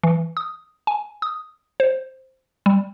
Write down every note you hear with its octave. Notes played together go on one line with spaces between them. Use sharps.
E3
D#6
G#5
D#6
C5
G3